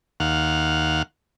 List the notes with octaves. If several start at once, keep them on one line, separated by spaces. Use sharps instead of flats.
D#2 F5 F#5